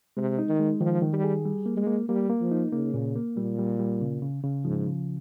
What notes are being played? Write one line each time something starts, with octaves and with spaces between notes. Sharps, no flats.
C3 G#3
D#4
D#3
G#3
D#3 F3
D#3
G3
G#4
G3
A#3
G#3
A#3
G3 A#3
A#3
F3
D#4
C#3 A#3
A#2
A#3
A#2 G3
G3
G3
C#3
C#3
C#3
G#2 F3
C#3